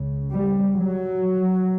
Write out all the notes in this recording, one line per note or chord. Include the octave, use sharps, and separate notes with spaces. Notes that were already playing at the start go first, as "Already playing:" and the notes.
Already playing: C#2 C#3
G3
F#3